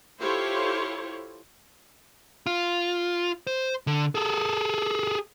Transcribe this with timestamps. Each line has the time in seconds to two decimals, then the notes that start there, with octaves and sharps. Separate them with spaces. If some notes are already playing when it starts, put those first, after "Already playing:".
0.20 E4 F4 G4 A4 C5 C#5
2.46 F4
3.47 C5
3.87 D3
4.15 G#4 A4